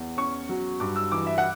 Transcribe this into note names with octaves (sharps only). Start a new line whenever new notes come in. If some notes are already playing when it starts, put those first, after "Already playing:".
Already playing: E2
C#4 C#6
F#3
G2 D6
E6
E3 D6
E5
F#5